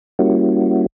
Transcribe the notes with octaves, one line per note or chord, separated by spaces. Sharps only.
G3 A#3 C#4 E4 F#4